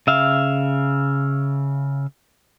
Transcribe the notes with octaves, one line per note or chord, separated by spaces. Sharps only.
C#3 E5 F5